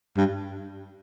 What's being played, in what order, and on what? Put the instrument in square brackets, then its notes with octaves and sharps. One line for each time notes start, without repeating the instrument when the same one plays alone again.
[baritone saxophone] G2